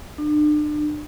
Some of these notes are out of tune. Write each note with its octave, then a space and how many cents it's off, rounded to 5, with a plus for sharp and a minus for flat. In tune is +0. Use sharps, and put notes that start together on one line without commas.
D4 +35